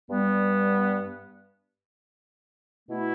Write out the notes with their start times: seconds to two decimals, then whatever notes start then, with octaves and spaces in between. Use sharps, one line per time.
0.09 G2 G3 B3
2.86 B2 A3 E4